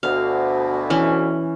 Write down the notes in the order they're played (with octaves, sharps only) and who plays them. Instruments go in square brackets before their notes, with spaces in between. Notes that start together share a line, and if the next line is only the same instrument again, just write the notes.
[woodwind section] D2 B2 [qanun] F5
[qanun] E3 C#4